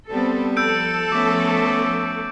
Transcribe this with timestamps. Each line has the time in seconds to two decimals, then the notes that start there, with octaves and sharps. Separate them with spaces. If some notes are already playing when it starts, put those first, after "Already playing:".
0.10 G3 B3 C4 A4
0.57 F3 A4 E6 G6 D7
1.12 A3 B3 C#4 D6